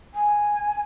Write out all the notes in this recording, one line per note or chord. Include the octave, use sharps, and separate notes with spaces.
G#5